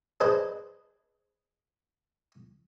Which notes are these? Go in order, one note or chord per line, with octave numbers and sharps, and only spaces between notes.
D4 G#4 B4 C5 D#5